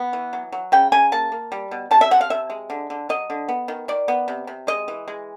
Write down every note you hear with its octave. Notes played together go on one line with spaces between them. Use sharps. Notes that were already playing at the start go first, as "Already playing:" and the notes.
Already playing: B3
E3
F#3
F#3
C#3 G5
C#3 G#5
A#3 A5
A#3
G3
B2
C3 A5
E5
F3 F#5
F5
C3 E5
G#3
D3
D3
F#3 D#5
D3
B3
D#3
D#3 D5
B3
C3
C3
G#3 D#5
E3
G#3